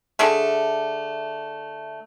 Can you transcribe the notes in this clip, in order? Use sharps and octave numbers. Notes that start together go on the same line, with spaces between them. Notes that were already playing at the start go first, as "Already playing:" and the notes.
D3 A3 G#4 E5